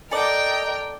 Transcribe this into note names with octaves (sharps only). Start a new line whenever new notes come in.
A4 A#4 D5 D#5 G5